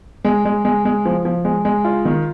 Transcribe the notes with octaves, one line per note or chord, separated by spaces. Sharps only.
G#3
G#3
G#3
G#3
F3
F3
G#3
G#3
F4
D#3